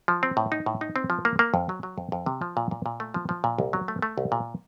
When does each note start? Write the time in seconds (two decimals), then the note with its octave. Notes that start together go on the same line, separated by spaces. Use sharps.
0.08 F3
0.23 C4
0.37 A2
0.52 D#4
0.66 A2
0.81 D#4
0.96 C4
1.10 F3
1.25 A#3
1.39 A#3
1.54 F2
1.69 F#3
1.83 F#3
1.98 F2
2.12 F2
2.26 C3
2.42 F3
2.57 A#2
2.71 A#2
2.86 A#2
3.00 A3
3.14 F3
3.29 F3
3.44 A#2
3.58 C2
3.73 F#3
3.88 A3
4.02 A3
4.18 C2
4.32 A#2